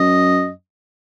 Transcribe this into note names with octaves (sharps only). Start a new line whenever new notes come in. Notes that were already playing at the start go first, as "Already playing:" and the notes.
Already playing: F#2 D#5